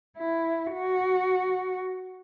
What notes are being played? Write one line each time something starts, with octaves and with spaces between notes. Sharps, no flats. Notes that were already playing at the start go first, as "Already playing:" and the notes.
E4
F#4